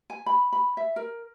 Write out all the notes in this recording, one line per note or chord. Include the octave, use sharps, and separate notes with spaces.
G#5
B5
B5
E5
A#4